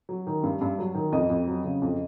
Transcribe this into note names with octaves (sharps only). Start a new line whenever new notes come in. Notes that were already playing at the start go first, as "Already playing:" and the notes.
F#3
D#3
G2
G2
F#3
D#3
F2 D#5
F2
F#3
C#3
F2